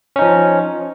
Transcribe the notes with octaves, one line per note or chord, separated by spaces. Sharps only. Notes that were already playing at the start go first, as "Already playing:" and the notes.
F3 C#4 D#4